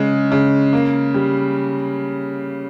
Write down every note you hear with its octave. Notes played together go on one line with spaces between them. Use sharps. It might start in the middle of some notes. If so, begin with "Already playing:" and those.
Already playing: C#3 G#3
C#3
A#3
G3